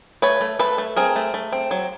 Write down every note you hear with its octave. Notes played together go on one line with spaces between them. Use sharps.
A3 B4 C#5
A3
A3 A4 B4
A3
C4 G#4 A#4
A3
A3
C4
F#3